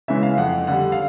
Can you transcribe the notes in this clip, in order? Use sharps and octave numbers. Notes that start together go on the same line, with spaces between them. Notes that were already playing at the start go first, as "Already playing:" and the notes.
C#3 E3 G#3 E5
F5
F2 F#5
D3 G3 F#5
F5